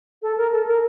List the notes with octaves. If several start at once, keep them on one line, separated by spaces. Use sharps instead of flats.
A4
A#4
A4
A#4